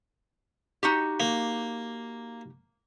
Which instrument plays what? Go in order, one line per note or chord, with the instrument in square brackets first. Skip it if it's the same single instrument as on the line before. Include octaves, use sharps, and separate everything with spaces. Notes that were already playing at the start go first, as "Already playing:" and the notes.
[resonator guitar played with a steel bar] D#4 F#4 G4
[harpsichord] A#3